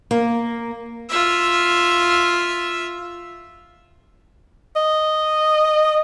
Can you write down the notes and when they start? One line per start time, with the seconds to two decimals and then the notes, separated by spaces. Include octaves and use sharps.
0.11 A#3
1.09 F4 E5
4.76 D#5